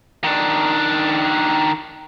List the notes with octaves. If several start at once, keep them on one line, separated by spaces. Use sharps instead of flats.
D#3 D4